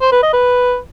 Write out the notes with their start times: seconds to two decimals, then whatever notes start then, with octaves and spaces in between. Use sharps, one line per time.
0.01 C5
0.12 B4
0.23 D#5
0.33 B4